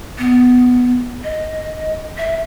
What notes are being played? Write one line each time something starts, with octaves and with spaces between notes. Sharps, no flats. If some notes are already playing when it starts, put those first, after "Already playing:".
B3
D#5
E5